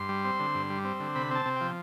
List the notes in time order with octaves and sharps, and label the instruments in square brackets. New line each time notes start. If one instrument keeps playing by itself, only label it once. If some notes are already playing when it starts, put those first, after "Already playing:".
Already playing: [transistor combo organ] G2 C6
G3
C4
D3
G2
G3
C4
D3
C3 B5
C4 A5
C3
F3 G5